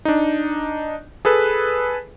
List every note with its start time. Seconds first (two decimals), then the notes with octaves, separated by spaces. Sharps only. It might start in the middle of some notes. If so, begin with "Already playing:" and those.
0.05 D4 D#4
1.25 G#4 A4 B4